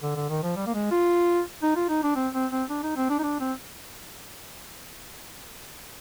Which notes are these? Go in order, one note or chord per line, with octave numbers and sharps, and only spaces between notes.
D3
D3
D#3
F3
G3
A#3
G#3
F4
D#4
F4
D#4
D4
C4
C4
C4
D4
D#4
C4
D4
D#4
D4
C4